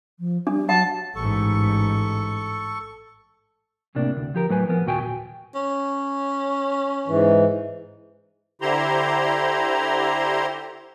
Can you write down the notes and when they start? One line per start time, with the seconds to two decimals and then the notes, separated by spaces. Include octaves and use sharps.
0.19 F3
0.47 G3 D4
0.69 F#3 F#5 A5
1.16 A1 G#2 A4 C#6
3.95 C2 A2 C3 A#3 D4
4.17 D2
4.34 F3 G4 A#4
4.50 A2 F#3 B4 G#5
4.69 F3 B3 A#4
4.86 D#2 A#2 F#4 G5 G#5
5.55 C#4
7.07 G#2 E3
8.61 D3 E4 G4 C5 A#5 C6